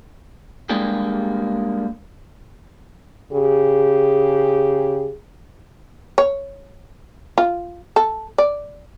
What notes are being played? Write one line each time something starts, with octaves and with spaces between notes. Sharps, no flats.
G3 G#3 A#3 D4 G4 G#4
C#3 G4 G#4
C#5
F4
A4
D5